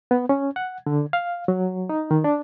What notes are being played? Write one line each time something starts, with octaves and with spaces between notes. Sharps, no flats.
B3
C#4
F#5
D3
F5
F#3
D#4
D#3
D4